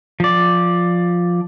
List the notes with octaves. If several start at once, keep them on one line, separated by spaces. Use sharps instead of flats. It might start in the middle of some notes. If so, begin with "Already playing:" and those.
F3 D5